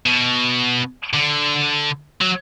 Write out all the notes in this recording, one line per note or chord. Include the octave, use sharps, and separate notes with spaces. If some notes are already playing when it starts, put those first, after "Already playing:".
B2
D3
F#3